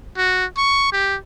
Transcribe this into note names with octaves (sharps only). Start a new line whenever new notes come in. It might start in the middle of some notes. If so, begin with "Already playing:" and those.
F#4
C#6
G4